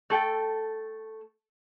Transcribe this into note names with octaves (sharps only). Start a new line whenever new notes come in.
A3 A4 G5